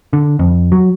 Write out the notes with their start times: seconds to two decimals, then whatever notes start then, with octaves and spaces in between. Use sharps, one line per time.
0.13 D3
0.39 F2
0.72 F#3